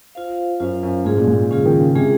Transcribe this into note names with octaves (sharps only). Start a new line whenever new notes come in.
F4 C5 F5
F#2 F4 C5 F5
F#2
G#2 G#3 C#4 F4 G#4
A#2
G#2
C#3 G#3 C#4 F4 G#4
D#3
C#3
C3 G#3 C#4 F4 G#4